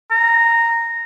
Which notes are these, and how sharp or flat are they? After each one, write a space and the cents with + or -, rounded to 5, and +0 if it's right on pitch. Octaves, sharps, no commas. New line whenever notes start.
A#5 -10